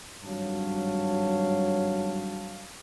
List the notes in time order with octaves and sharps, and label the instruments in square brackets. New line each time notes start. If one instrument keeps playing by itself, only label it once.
[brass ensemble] G#1 G2 F#3 C#5 F5 A5